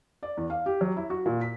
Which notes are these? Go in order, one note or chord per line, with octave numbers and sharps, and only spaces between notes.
D5
E2
F5
G4
F#3
E4
F#4
A#2
B6